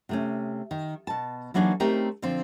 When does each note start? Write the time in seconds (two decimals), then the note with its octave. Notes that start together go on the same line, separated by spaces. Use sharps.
0.09 C3 A3 C#4
0.71 D#3
1.07 B2 A5
1.54 E3 F#3 A#3 D4 D#4 G#4
1.80 A3 C4 C#4 D#4 G4 A#4
2.22 D3 F3 C4